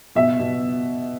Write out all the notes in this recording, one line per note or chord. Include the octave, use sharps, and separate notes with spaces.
B2 E5
B2